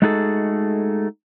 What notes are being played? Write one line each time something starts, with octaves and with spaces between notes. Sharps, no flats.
G#3 A3 D#4 F#4 G#4 A4